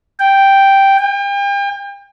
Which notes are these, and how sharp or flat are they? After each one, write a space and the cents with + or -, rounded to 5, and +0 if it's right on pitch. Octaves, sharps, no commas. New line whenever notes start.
G5 +0
G5 +40